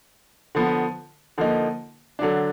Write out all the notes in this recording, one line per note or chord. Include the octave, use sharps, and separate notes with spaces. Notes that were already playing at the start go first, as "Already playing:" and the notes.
D3 F3 B3
D3 F3 A#3 D#4
D3 F#3 D4